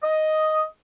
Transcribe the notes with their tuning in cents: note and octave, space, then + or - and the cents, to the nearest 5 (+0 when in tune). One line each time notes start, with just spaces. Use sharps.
D#5 +5